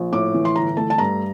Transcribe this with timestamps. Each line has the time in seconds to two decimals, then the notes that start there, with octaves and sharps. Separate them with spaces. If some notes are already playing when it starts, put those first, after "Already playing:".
Already playing: A#1
0.12 A2 D6
0.34 E3
0.45 C6
0.56 G1 A#5
0.77 A3 A5
0.90 A5
0.98 G2 A#5